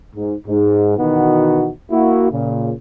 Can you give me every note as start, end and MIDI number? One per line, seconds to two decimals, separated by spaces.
0.15 0.35 44
0.47 0.96 44
0.98 1.70 47
0.98 1.70 51
0.98 1.70 52
0.98 1.70 59
0.98 1.70 63
0.98 1.70 66
1.91 2.30 58
1.91 2.30 64
1.91 2.30 66
2.31 2.71 46
2.31 2.71 49